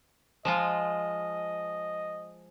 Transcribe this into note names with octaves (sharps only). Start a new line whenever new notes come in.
F3 G#3 F4 D#5